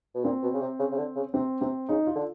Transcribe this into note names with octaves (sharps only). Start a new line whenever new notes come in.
B2
A#2 C4
B2
C#3
C3
C#3
C#3
D3
C#3
C3 C4
C3 C4
C#3 D#4
F4
D3